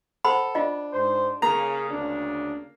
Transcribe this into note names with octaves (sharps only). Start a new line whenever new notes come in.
A4 C5 F#5 B5
D4 F4 D#5
G#2 C5
C#3 A#3 G#4 A#5
D2 C#3 D4